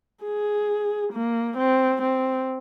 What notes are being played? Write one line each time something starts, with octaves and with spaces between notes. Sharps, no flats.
G#4
A#3
C4
C4